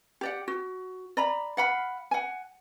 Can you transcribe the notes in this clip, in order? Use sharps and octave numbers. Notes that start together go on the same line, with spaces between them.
G4 D5 F#5
F#4
D5 A#5 B5
F5 F#5 B5
F#5 G#5